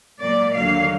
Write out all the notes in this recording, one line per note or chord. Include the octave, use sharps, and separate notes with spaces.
A#2 F#3 A#3 D5
D#2 D3 F#3 A#3 F5